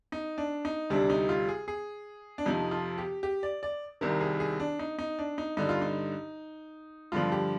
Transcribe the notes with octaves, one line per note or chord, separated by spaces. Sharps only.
D#4
D4
D#4
D2 C3 G3 D4
D#4
F4
G#4
G#4
D4
F2 C3 F3 D#4
F4
G4
G4
D5
D5
C2 C3 D#3 A#4
G#4
G#4
D4
D#4
D#4
D4
D#4
G2 D3 G3 D#4
F4
D#4
G2 D3 F3 F4
G4